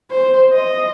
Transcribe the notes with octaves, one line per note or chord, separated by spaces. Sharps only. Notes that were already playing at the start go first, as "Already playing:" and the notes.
C5
D#5